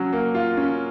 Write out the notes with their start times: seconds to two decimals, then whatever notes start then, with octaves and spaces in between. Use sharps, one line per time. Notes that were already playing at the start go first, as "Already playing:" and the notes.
Already playing: F#3 C#4
0.13 A#3
0.35 F4
0.57 C#4